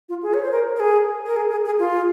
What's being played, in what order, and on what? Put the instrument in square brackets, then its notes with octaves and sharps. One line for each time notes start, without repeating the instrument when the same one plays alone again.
[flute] F4
G#4
C#5
C5
A#4
A#4
G#4
A#4
G#4
G#4
G#4
F4